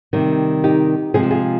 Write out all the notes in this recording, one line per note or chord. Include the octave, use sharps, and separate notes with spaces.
C3 D#3 G3
D#4 G4
C3 F3 G#3 G#4
G4
F4 G#4